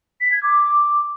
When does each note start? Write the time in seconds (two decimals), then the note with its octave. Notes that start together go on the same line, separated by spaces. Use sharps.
0.21 B6
0.32 G#6
0.43 D6